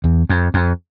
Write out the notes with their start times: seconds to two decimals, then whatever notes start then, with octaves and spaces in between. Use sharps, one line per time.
0.04 E2
0.29 F2
0.54 F2